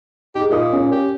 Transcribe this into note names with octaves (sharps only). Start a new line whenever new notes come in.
D#4 G4 G#4
A#2 D#5 D#6
C#4
G4